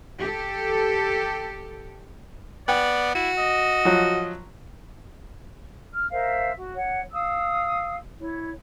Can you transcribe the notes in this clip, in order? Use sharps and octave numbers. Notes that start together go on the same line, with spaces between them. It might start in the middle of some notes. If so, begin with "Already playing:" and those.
G4 A4
B3 D5 G5
E4 F#4
D#5
F3 F#3
F6
A#4 C5 E5 F5
F#4
C#5 F#5
F5 D#6 E6
E4 C#5